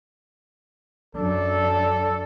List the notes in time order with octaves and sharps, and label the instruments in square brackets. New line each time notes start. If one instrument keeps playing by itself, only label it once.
[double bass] F#2 D4 [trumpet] A4